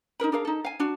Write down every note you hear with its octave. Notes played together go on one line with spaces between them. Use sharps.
D#4 G#4 A#4 B5
D4 G#4 A#4 F5
D#4 A4
F5 G#5
D4 F#4